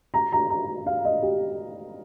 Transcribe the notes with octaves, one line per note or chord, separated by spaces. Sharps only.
A#5
A#5
A#5
F5
D#5
G4